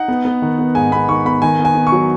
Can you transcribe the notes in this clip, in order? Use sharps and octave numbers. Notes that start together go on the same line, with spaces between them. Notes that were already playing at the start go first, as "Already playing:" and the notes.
Already playing: D#4 F#5
B3
B3
D#3
B3
G#2 G#5
B3 B5
D#3 C#6
B3 B5
D#3 G#5
B3
G#5
B3
C#6
F#3